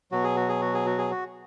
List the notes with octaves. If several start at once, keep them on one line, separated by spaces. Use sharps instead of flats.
B2 F#3 F#4
G#4
F#4
G#4
F#4
G#4
F#4
G#4
F#4